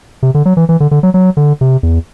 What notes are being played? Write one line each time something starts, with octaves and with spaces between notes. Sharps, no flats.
C3
D3
F#3
E3
E3
D3
D3
F#3
F#3
D3
C3
E2